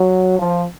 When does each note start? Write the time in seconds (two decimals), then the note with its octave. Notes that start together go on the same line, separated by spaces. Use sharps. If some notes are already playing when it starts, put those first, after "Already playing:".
Already playing: F#3
0.39 F3